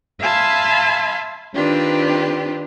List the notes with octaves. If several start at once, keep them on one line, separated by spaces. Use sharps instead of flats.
E5 F5 G#5 A5 B5 C6
D#3 C4 D4 F4 G4 B4